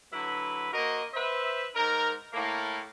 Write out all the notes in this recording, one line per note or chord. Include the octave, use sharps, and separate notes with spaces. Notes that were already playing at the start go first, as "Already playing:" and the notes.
D3 F#3 E4 B4
A#3 F#4 A#4 C5 D#5
B4 C5 E5
G#2 D#4 A#4
A2 A#3